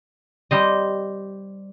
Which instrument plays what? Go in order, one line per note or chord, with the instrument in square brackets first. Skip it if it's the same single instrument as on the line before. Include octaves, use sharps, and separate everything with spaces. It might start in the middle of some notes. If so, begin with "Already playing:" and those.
[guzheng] G3 C5 D#5